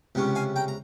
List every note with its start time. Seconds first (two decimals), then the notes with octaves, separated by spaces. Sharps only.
0.15 C#2 C3 G3 C#4
0.35 F5 G#5
0.56 G5 A#5
0.68 A#5